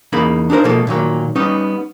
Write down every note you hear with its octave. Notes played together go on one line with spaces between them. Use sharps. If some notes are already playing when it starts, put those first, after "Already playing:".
E2 C#3 A#3 D#4 B5
D4 D#4 G4 A#4 C5
B2 F3 G#3 A#3 A4
A#2 D#3 F#3 A#3
G3 B3 C#4 D#4